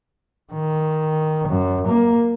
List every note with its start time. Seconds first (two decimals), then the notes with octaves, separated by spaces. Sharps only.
0.53 D#3
1.48 F#2
1.87 A#3